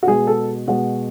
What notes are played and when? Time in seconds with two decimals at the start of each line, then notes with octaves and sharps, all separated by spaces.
0.03 F#4
0.07 B2 G#3 G#4
0.27 A4
0.67 B2 G#3 F#4